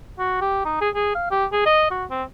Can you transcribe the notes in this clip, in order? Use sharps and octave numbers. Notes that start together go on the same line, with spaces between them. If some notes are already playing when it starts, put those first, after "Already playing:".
F#4
G4
D#4
G#4
G#4
F5
G4
G#4
D#5
F#4
C4